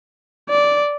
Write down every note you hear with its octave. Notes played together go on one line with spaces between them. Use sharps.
D5